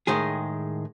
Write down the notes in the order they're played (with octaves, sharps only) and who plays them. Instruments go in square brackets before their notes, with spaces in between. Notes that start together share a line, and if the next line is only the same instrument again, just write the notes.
[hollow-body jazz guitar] A2 D#3 G#3 G#4